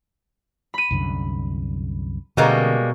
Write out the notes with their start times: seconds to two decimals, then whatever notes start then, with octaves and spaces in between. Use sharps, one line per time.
0.74 B5 D#7
0.91 C2 F#2 D3
2.37 B2 D3 G3 G#3 A#3 C#4 A#4 C#6